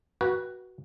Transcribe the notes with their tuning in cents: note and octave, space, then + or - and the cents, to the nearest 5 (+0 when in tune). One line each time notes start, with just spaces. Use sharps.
F#4 +5 B4 -25 G5 +0